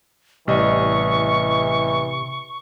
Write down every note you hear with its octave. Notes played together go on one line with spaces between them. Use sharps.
A1 C3 E3 G3 D#5 C#6